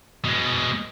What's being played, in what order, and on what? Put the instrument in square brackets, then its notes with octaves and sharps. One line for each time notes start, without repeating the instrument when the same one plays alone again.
[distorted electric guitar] B2 G#3